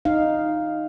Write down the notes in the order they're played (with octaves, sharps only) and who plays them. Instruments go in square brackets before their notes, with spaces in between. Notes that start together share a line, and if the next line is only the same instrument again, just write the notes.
[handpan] D#4 F5